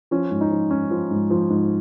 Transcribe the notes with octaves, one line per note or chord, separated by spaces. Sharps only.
F3 C#4
G#2
D#4
F3
G#2 C#4
F3
G#2
F3
G#2